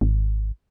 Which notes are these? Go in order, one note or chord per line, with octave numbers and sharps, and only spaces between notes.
G#1